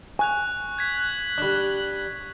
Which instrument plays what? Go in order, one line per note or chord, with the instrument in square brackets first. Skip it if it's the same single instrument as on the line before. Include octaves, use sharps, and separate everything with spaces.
[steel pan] G#5 [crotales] C#6 F#6 F7
[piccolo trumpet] F#6 [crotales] G#6 B6
[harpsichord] G3 D4